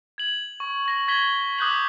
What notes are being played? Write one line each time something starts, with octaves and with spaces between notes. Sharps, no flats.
G#6 F#7
C#6
C#6 A#6 F#7
C#6 G#6 B6 F#7 G7
D6 D#6 F#6 G6 B6 F#7